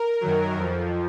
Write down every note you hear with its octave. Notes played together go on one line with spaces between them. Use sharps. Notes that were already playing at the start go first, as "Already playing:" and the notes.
Already playing: A#4
F#2 D#3 F#3
F2 F3